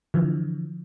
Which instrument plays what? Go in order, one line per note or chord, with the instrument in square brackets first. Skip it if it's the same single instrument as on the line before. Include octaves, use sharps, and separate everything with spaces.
[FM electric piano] D3 E3 F3